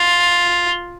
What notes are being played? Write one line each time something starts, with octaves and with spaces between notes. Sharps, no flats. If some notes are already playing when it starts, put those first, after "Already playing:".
Already playing: F4